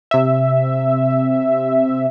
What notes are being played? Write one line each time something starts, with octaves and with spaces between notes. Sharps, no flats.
C3 E5